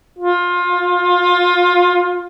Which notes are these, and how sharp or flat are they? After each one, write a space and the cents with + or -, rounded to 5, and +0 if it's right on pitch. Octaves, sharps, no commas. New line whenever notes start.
F4 +20